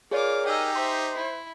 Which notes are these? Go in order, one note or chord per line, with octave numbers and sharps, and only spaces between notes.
F4 G#4 A#4 C#5 D5 D6
D#4 G4 G#4 D#5 G5 E6
C5 E5 C6
E4